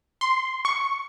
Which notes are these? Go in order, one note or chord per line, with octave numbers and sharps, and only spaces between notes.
C6
C#6